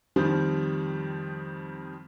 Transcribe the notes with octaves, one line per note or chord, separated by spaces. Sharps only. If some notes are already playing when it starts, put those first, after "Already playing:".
F2 D#3 F3 G3